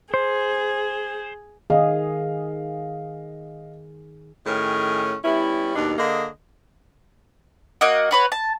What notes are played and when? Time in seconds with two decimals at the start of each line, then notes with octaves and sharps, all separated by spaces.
0.14 G#4 C5
1.70 D#3 G#4 D#5 F5
4.46 A2 D#3 C#4 G#4 A#4
5.24 G3 B3 C#4 E4
5.76 D#2 B2 D4 D#4
5.98 D3 A#3 G#4 D#5
7.81 A#3 F#4 D#5 F#5
8.11 F#4 B4 C#5
8.32 A5